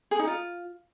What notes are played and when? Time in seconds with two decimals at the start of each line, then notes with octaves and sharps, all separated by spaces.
0.11 G#4
0.19 D#4
0.27 F4